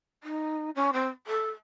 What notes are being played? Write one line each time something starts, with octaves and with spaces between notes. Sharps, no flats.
D#4
C#4
C4
A4